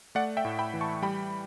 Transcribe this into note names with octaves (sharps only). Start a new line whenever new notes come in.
A3 D5 F#5
E5 G5
A2
G5 B5
E3
A5 C#6
G3 G5 B5